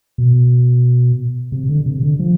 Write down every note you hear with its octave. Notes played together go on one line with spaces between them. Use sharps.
B2
C3
D3
C3
D3
F3